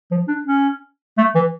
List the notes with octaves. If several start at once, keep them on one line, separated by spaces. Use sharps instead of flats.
F3
D4
C#4
A3
E3